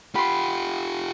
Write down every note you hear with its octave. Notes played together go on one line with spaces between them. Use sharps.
F4 G4 B5 C6